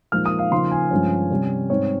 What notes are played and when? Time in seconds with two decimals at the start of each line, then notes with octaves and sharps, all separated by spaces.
0.12 A#2 F3 G#3 D#4 F6
0.26 D#6
0.39 F5
0.51 C#3 F3 A#3 D#4 C6
0.71 G#5
0.91 G2 F3 G#3 C#4
1.30 C3 G3 C#4
1.70 G#2 G3 C4 D#4 C#5